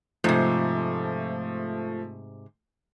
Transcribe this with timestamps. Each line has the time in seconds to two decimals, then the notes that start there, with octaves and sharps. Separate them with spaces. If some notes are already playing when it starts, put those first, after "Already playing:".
0.24 G#2 C3 F3 A3